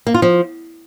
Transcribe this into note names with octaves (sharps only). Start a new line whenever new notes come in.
A#3
F4
F3